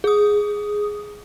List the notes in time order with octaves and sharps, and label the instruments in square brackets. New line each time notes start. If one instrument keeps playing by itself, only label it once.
[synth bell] G#4 D#6